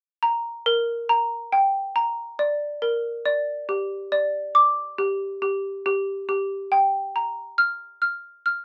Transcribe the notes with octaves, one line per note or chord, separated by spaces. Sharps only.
A#5
A#4
A#5
G5
A#5
D5
A#4
D5
G4
D5
D6
G4
G4
G4
G4
G5
A#5
F6
F6
F6